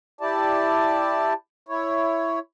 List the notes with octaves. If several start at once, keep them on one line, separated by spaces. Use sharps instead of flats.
E4 G4 D5 A5
E4 C#5